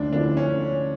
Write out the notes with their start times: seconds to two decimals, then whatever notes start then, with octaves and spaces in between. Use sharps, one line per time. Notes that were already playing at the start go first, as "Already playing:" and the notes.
Already playing: D2 D4
0.13 D3 F3 C#4 D4 E4
0.37 C#4